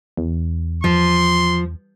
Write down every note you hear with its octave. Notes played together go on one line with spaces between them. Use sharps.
E2
F3 C6